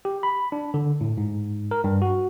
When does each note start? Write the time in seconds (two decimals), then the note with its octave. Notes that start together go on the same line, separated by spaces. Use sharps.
0.05 G4
0.23 B5
0.52 D4
0.74 D3
1.01 A2
1.18 G#2
1.71 A#4
1.84 G2
2.02 F#4